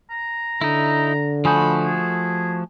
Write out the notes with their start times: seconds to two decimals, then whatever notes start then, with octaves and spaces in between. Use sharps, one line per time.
0.10 A#5
0.61 D3 D#4 E4
1.45 F3 A3 F#4 G#5 B5 D#6 G6
1.85 G#4